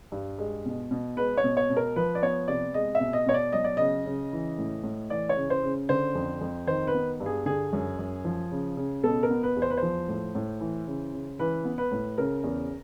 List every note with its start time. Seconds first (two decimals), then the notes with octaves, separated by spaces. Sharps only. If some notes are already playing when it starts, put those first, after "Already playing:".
0.12 G2
0.38 G#3
0.66 B2
0.91 B2
1.17 G#3 B4
1.37 C#5
1.44 B2
1.57 C#5
1.70 B2
1.77 A#4
1.96 F3 B4
2.15 D5
2.22 B3 C#5
2.48 C3 D5
2.74 G#3 D#5
2.95 E5
3.00 B2
3.13 D#5
3.26 B2 C#5
3.34 D5
3.53 F#3 D#5
3.64 D5
3.77 C#3 D#5
4.06 C#3
4.32 E3
4.58 A2
4.84 A2
5.10 E3 D5
5.29 C#5
5.37 C#3
5.50 C5
5.63 C#3
5.89 D3 C5
6.15 F2
6.41 F2
6.67 D#3 C5
6.87 B4
6.94 B3
7.20 G2
7.26 G#4
7.46 D3 G#4
7.73 F#2
7.99 F#2
8.25 F3
8.51 C#3
8.77 C#3
9.04 B2 A4
9.23 A#4
9.30 B3
9.43 B4
9.56 E2
9.62 C5
9.70 B4
9.77 C5
9.82 F3
10.08 A2
10.35 A2
10.60 E3
10.87 C#3
11.14 C#3
11.39 E3 B4
11.65 B3
11.78 B4
11.92 A2
12.18 C#3 A#4
12.44 E2